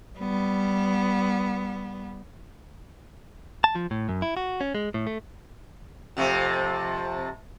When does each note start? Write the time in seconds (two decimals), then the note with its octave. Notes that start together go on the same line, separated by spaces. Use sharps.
0.19 G3 B3
3.64 A5
3.75 F3
3.91 A2
4.09 F#2
4.22 E4
4.37 F#4
4.61 C#4
4.75 G#3
4.94 A2
5.07 A3
6.17 F2 C3 A3